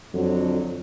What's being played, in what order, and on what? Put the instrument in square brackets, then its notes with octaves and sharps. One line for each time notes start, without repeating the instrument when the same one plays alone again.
[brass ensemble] F2 D3 F#3